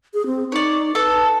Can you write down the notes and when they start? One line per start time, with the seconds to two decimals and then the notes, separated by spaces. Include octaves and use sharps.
0.14 G#4
0.26 C4
0.52 D#4 C#5 D5
0.95 A4 B4